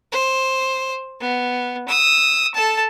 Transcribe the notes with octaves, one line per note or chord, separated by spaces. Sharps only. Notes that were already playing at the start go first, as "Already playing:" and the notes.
C5
B3
D#6 E6
A4 A5